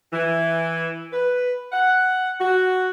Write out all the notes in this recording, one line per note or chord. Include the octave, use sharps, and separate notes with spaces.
E3
B4
F#5
F#4